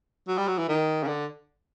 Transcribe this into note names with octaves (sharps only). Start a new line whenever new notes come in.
F#3
G3
F#3
E3
D#3
C#3
D3